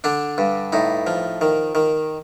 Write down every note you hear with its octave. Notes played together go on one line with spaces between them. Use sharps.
D3 D4
G2
A2 D#4
F3
D#3
D#3